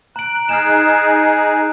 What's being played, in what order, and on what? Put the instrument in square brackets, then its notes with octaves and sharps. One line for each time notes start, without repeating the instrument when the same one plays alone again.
[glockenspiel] A#5 D7 [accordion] F#6
[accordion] D#4 G#4 [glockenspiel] F6 F#6 E7